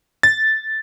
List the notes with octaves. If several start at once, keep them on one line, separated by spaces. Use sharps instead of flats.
A6